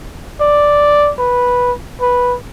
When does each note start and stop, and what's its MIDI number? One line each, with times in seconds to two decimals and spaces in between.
0.41 1.12 74
1.19 1.72 71
2.01 2.36 71